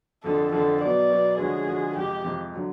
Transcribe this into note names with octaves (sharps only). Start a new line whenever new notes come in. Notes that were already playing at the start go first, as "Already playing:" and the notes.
F2 D3 F3 A4
F2 D3 F3 A4
B2 F#3 B3 D5
B2 F#3 B3
D3 F3 G#3 C#4 F#4 G#4
D3 F3 G#3 C#4 F#4
F2 C3 F3 G#3 G4
F2 C3 F3 G#3
D3 F#3